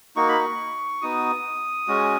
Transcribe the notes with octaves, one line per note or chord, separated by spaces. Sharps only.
A#3 D#4 F#4 C#6
B5
C#6
B3 D#4 F#4 D#6
G#3 C#4 F#4